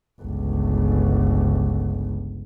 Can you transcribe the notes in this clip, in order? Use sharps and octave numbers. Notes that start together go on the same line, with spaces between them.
G1 C#2